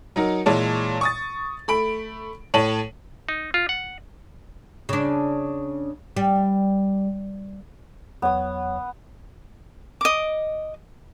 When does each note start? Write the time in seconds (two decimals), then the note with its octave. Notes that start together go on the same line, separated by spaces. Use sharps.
0.16 F#3 D#4 A#4
0.46 A#2 E3 G#3 C#5 A5
1.01 C#6 D#6 A6
1.68 A3 B5 D7
2.54 A2 C#5 A5 D#7 F#7
3.29 D#4
3.54 F4
3.69 F#5
4.89 C#3 D4
6.16 G3
8.22 E2 F#3 B3 C#5 D#6
10.01 D#5 D6